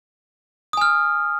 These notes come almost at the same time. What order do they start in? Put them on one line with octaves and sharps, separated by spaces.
D#6 G#5 F6